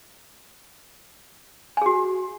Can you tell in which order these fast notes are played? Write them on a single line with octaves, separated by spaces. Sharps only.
G#5 G#4 F#4